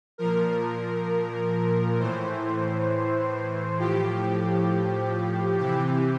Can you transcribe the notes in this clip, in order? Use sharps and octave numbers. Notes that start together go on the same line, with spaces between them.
A#2 F3 A#4
A2 E3 C5
A2 F3 G4
C3 E3 G4